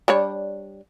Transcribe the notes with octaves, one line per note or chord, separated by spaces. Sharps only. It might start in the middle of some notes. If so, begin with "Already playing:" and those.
G3 D4 C#5